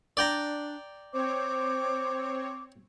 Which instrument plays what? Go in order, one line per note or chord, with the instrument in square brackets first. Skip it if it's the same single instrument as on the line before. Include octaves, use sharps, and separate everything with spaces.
[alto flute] D4 [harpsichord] D5 G5 A#5
[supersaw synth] C4 C#5 [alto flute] C5 [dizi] D6